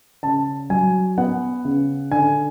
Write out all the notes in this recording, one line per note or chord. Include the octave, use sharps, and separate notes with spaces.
C#3 A5
F#3 G#5
B3 F#5
C#3
D3 G#5